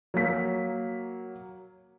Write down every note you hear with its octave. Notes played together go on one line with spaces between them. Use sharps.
F#3 A#3 B6